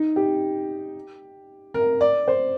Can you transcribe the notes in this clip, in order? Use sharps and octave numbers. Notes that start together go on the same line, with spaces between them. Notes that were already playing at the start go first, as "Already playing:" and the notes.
Already playing: D#4
G4
A#4
D5
C5